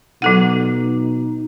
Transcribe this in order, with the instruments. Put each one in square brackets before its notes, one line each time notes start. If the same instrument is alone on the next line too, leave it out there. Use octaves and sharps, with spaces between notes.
[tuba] B2 [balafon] F#3 A4 F#5 [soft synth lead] D#4